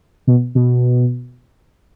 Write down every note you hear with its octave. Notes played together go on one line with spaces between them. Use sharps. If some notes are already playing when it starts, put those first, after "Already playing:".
B2
B2